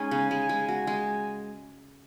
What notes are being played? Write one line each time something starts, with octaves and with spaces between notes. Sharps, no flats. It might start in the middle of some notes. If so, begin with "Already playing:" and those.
Already playing: G#3 C#4 D#4 G#5
C#3
G#3 G#5
G#3
F#4 G#5
G#3